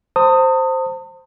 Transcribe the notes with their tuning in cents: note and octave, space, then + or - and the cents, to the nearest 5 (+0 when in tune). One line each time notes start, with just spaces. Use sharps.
C5 +0 A5 +45 D#6 +0